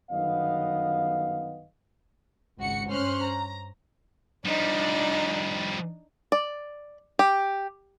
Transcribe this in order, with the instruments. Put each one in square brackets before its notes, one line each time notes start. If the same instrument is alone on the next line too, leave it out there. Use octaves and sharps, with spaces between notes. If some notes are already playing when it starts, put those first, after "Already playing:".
[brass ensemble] G1 F#2 D#3 B3 D#5 F5
[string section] G#1 C#2 F#4 C#7
G2 C#4 C5 C6 F6 F#6
A#5
[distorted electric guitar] F3 G3 [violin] D4 D#4
[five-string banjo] D5
G4